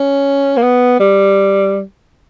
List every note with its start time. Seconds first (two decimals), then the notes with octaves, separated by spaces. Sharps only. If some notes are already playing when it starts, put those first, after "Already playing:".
Already playing: C#4
0.57 A#3
0.63 B3
1.00 G3